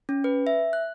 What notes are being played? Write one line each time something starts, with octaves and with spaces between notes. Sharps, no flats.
C#4
B4
E5
F#6